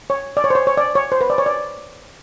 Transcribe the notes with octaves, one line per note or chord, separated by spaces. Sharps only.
C#5
D5
C#5
C5
C#5
C#5
D5
C#5
C5
B4
D5
C#5
D5